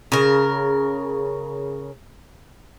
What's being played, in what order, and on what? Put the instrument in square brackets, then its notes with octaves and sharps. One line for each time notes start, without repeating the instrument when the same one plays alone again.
[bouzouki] C#3 A#4